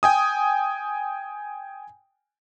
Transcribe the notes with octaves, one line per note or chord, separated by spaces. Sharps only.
G5 G#5 D#6